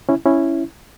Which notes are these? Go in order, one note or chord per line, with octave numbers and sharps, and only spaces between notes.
C#4 E4
C#4 E4